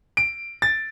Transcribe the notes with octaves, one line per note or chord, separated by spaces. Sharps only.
D7
A6